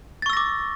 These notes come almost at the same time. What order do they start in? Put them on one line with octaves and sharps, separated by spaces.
A6 C#6 E6 A#6 D6